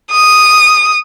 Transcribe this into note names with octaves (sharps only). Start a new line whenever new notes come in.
D#6